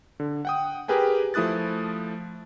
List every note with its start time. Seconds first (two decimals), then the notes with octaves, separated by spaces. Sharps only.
0.20 D3
0.45 F#5 G5 D#6
0.88 G4 G#4 A#4 B4 G5 G#5
1.34 F3 A3 E4 D#6 F#6 A6